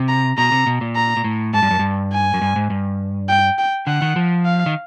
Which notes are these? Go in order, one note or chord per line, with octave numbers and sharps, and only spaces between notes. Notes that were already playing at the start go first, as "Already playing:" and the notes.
Already playing: C3
A#5
B2 A#5
C3
B2
A#2
A#5
A#2
A2
G#2 A5
G2
F#2
G2
G#5
F#2
G2
G#2
G2
G5
G5
D3 F#5
D#3
F3
F5
D#3